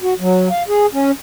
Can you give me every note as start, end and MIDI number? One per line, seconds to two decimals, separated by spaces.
0.01 0.13 66
0.20 0.49 54
0.51 0.63 77
0.68 0.86 68
0.93 1.11 61